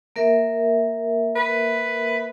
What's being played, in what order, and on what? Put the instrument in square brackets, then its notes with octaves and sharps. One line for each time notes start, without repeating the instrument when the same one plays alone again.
[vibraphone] A#3 A#4 E5
[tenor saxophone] B4